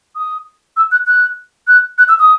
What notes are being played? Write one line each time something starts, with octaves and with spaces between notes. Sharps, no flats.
D#6
E6
F#6
F#6
F#6
F#6
E6
D#6